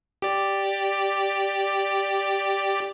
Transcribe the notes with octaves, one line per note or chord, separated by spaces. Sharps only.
G4 D5